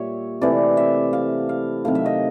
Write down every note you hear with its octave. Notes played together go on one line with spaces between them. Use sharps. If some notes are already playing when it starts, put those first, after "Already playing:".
Already playing: A#2 G3 C#5 E5
C3 E3 A3 D5
E5
F5
F5
C3 D#3 F#3 A3 F5
E5
D#5